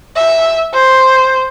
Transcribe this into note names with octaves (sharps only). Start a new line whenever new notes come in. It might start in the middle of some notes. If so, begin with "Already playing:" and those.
E5
C5